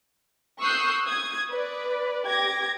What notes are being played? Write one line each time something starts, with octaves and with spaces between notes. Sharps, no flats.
C#6 D#6 E6 F#6 G6 C7
D#6 G#6
B4 D5
G4 D6 G#6 A#6